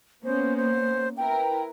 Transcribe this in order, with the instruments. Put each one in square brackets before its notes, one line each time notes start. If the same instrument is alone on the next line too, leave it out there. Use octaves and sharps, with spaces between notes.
[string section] A#3 B3 C#4 [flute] C5
[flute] C5
[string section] E4 A#4 B4 [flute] G5